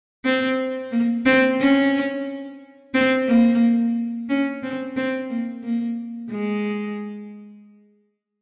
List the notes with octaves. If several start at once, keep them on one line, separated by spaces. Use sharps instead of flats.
C4
A#3
C4
C#4
C4
A#3
C#4
C4
C4
A#3
A#3
G#3